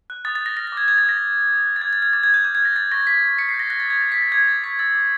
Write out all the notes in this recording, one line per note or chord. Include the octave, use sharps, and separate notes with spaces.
F#6
D#6 A6
A6
G6 A#6
F6 A#6
A#6
D6
G#6
G6 G#6
A6
D#6
A#6
D#6
D#6
D#6
F#6
A6
D6 G#6
A6
F6
G#6
D6 A6
G#6
F#6 G6
D6 G6
G#6
F#6 A#6
E6 A6
C#6 A#6
G6 B6
G6
D#6 B6 C#7
C7
G6
A#6
F#6 A#6
A6
D#6
G#6
G6 A6
B6
E6
A6
D6 G#6
D6 A6
C#6 B6
E6 A6
D6